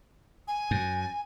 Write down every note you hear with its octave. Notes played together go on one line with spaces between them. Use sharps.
G#5
F#2